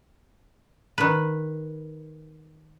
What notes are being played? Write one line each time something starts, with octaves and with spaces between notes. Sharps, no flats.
D#3 B4